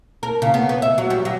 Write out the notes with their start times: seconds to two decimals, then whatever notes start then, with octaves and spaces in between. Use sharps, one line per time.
0.23 A#4
0.42 C#3
0.54 B3
0.69 B3
0.82 E5
0.98 F#3
1.10 G3
1.25 F#3